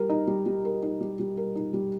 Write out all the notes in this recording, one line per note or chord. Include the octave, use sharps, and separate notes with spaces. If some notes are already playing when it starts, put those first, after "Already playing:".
Already playing: G3 A#4
D#4
G3
G3
A#4
D#4
G3
G3
A#4
D#4
G3